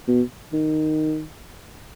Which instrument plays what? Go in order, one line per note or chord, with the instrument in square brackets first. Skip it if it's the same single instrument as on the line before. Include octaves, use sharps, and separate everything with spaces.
[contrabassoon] B2
D#3